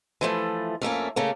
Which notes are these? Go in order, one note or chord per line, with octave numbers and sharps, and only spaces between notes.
E3 F3 A3
F2 A3 A#3 C#4
C#3 A3 A#3